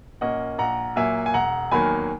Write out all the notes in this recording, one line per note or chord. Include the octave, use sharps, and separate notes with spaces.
A#2 A#3 C#4 D#5 F#5
A#1 F#5 A#5
A#2 F#3 A#3 E5 G#5
G#5
E1 F#5 A#5
E2 D#3 F#3 A#3 G#5 B5